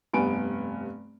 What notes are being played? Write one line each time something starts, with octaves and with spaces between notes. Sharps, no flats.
F1 G2 B3 G#5 D7